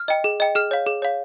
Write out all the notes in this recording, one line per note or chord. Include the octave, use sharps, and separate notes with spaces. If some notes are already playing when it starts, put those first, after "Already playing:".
Already playing: F6
D#5 G5
G#4
D#5 G5
G#4 F6
C#5 F5
G#4
C#5 F5